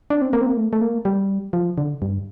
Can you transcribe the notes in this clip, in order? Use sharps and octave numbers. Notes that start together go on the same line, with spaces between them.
D4
C4
A#3
C4
A#3
A3
A3
A#3
G3
F3
D3
G2